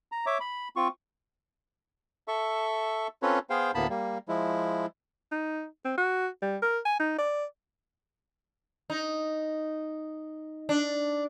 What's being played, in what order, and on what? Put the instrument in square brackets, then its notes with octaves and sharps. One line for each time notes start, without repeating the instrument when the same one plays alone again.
[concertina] A#5
C#5 E5 D6
B5
C4 F4 C#6
[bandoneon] A4 E5 C#6
C4 C#4 F4 A4 B4 C#5
B3 G#4 C5 F5 G5
D2 A2 A#3 B3 A5 B5
G3 A#3
F3 G#3 E4
[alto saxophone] D#4
C4
F#4
G3
A#4
G#5
D#4
D5
[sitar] D#4
D4